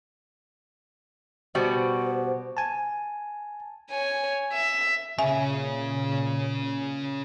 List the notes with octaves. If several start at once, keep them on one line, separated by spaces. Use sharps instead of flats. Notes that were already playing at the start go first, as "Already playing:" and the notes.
B2 G3 F#4 C5
G#5 A5
C#5 G#5
E5
A#2 C#3 C#4 G#4 E5 G#5